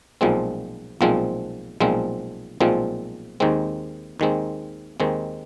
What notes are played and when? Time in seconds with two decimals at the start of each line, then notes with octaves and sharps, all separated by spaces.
0.21 B1 A#2 F3 G#3 C4
1.01 B1 A#2 F3 G#3 C4
1.80 B1 A#2 F3 G#3 C4
2.60 B1 A#2 F3 G#3 C4
3.40 D#2 D#3 G#3 C4
4.20 D#2 D#3 G#3 C4
5.00 D#2 D#3 G#3 C4